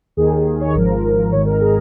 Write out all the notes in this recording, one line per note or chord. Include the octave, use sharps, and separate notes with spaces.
D#2 D#3 G#4
C#5
G#1 G#2 F3 A#4
G#1 G#2 D#3 C#5
A#4
G#4